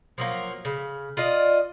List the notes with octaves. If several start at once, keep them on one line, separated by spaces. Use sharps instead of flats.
F3 F#3 A#3
C#3
F4 D5 D#5